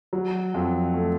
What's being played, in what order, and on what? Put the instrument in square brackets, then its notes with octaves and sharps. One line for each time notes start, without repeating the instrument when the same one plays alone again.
[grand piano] F#3
F2
A3